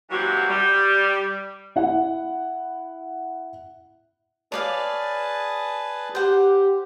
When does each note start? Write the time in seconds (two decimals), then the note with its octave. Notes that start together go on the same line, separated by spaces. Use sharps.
0.10 E3 F#3 G3 A#3 C4 F#4
0.49 G3
1.76 E4 F#5
4.52 G#4 B4 C#5 D5 F5 A5
6.15 G4 C5 F#5